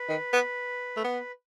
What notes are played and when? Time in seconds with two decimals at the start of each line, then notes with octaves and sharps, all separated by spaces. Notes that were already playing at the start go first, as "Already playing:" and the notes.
Already playing: B4
0.09 D#3
0.33 B3
0.97 A3
1.04 B3